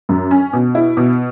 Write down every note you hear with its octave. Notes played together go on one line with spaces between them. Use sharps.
F#2
C#4
B2
E4
B2